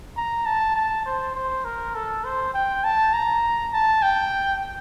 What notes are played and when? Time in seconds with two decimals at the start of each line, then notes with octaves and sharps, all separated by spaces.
0.17 A#5
0.46 A5
0.76 A5
1.06 C5
1.35 C5
1.65 A#4
1.95 A4
2.24 C5
2.54 G5
2.84 A5
3.14 A#5
3.73 A5
4.03 G5